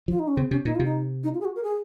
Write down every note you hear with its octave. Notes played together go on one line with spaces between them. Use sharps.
F3 F4
D#4
C#4
C#3 C4
C3 C#4
A#2 D#4
C3 F4
D#4
D#4
F4
G#4
F#4
A#4
G#4